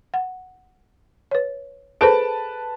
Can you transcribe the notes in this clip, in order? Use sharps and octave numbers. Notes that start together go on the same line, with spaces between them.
F#5
B4 C#5
G#4 A4 B4 C5 A5 D7